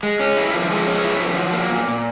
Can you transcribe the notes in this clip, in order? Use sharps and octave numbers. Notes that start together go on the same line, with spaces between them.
G#3
C#4
E4
F3
G#3
C#4
E4
F3
F#3
A#3
A#2
A#2